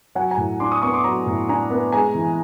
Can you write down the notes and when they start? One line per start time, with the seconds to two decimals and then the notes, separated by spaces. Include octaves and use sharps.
0.15 F#3 F#5 G#5
0.31 G#5 A#5
0.37 A2
0.60 D4 C6 D6
0.71 C#6 D#6
0.82 B3 C#6 D#6
0.93 C6 D6
1.04 F#3 A#5 C6
1.26 A2
1.49 D4 G#5 A#5
1.70 B3
1.92 G#3 G#5 A#5
2.15 E3